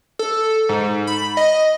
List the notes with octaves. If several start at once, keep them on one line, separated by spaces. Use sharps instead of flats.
A4
G#2
B5
D#5